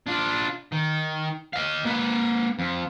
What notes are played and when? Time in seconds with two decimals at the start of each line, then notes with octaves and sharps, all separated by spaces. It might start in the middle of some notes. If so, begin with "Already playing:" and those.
0.07 D4 F4
0.72 D#3
1.53 D#5 F5
1.85 A#3 B4
2.59 F2